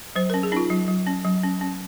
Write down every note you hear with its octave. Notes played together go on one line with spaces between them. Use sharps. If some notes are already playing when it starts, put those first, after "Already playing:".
F#3 C5
C#4 A#4
G#4
C#4 D#4 F4
F#3
F#3
C#4
F#3
C#4
C#4